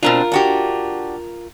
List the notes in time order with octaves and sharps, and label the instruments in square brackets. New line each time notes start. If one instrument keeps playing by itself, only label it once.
[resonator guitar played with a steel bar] B2 C4 D4 [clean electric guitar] F4 A#4
[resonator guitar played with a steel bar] D4 F#4 G4